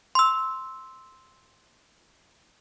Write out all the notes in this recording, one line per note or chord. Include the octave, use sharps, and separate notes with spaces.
C6 E6